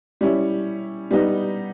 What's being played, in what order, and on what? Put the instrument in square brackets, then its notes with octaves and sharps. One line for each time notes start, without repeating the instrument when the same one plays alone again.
[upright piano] G3 C#4 E4
G3 B3 D#4